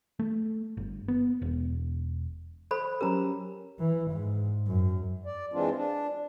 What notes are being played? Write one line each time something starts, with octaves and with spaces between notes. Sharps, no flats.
A3
G1
B3
E1
A4 C5 B5
F#3 C#4 G4 A#4 A#5 B5
E3
G#2
F#2
D5
E3 G#3 C4 D4 F4
D4